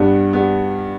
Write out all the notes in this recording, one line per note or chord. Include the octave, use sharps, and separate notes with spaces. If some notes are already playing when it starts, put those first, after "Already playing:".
Already playing: G2 G3 B3
G3 B3